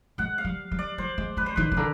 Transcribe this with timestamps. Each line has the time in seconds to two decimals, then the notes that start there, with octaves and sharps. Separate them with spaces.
0.18 G#3 F#5
0.38 F5
0.45 G3
0.71 G3
0.79 D5
0.98 G3 C5
1.18 G#3
1.37 G#3 B4
1.46 C5
1.56 D#3 B4
1.71 C#3
1.77 D3 A#4